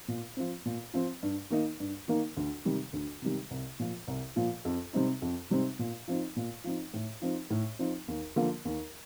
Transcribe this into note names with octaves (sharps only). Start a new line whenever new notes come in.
A#2
F3 C4
A#2
F3 C4
G2
D#3 A#3 D#4
G2
D#3 A#3 D#4
D2
C3 D#3 G3
D2
C3 D#3 G3
C2
A#2 F3
C2
A#2 F3
F2
C3 G3 C4 D#4
F2
C3 G3 C4 D#4
A#2
F3 C4 D#4
A#2
F3 C4 D#4
A2
F3 C4 D#4
A2
F3 C4 D#4
D#2
D3 F3 A#3
D#2